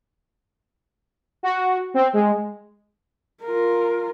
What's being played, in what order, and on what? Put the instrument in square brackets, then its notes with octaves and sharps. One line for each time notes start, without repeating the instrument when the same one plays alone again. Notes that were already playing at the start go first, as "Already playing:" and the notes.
[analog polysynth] F#4
C4
G#3
[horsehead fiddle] F4 A#4